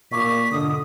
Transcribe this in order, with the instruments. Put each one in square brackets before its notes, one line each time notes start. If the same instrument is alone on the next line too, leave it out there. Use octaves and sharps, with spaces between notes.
[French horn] A#2 [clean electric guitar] G4 A4 C#5 [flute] B6
[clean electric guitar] B1 G#2 D#5 [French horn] D3 [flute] D#6